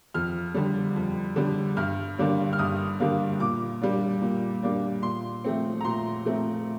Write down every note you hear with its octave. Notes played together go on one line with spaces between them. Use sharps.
F2 F6
D3 G3
F2
D3 G3
G2 F6
D3 G3 A#3 D4
F6
G2 D#6
D3 G3 A#3 D4
A#2 D6
G3 A#3 D4
A#2
G3 A#3 D4
A#2 C6
F3 A3 C4
A#5
A#2 C6
F3 A3 C4